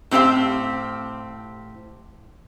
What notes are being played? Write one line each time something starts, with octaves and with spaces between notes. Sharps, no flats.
A2 C4 G4 C5 F5